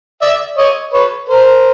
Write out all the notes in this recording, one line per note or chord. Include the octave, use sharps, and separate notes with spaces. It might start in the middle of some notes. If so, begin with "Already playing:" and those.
D5 E5
C#5 D#5
B4 C#5
A#4 C5